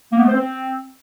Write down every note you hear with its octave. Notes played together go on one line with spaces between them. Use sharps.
A#3
B3
A3
C5
C4